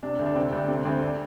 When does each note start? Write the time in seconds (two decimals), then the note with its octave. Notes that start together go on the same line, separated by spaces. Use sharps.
0.03 C3 D4
0.19 D2
0.26 D4
0.35 C3 C4
0.52 D2 D4
0.68 C3 C4
0.85 D2 C4
1.02 D4